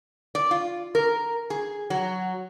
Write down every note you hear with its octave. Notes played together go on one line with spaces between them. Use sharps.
D5
F4
A#4
G#4
F#3